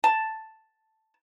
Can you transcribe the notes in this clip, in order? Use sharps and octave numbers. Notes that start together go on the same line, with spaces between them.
A5